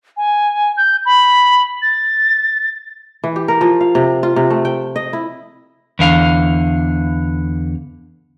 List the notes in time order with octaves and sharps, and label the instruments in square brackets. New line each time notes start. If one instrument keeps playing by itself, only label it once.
[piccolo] G#5
G6
B5
A6
[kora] E3
G4
A#4
F3
F5
C3
F4
C3
A3
G5
D#5
E4
[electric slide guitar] E2 D3 F5